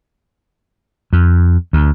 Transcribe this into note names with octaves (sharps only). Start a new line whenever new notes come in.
F2
D2